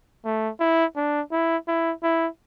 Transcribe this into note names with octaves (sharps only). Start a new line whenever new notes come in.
A3
E4
D4
E4
E4
E4